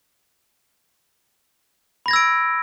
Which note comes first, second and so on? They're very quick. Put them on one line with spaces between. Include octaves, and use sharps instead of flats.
B5 A#6 G#6 E6 D7